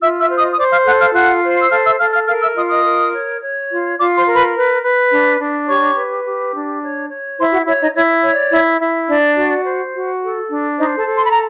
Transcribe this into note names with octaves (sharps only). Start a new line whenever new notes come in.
F4 E5 E6
E5 E6
C5
D#5 D#6
D#6
C5 D5 D6
F5 F6
A4 F#5 F#6
F5 F6
F4 F#5 F#6
C5
E6
A4 F5 F6
E5 E6
A4 F5 F6
F5 F6
A#4 F5 F6
E5 E6
F4 D#5 D#6
D#5 D#6
A#4
C#5
C#5
F4
F4 D5 D6
C5 C6
A#4
B4 B5
B4
B4
D4
D4
G4 C#5 C#6
B4
G4
D4
C#5
C#5
E4 C5 C6
F#4 F#5
E4 C#5 E5
D#4 D#5
E4 C#5
C#5
D5
E4
E4
D4 D5
F#4
C5
F#4
A4
D4
D#4 C5 D#5
A4 A5
A4
C6
B5
A#5